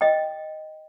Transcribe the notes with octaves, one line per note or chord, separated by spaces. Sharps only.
D#5 G5